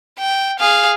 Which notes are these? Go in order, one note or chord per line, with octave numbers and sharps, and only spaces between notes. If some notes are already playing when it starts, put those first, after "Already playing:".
G5
G#4 F5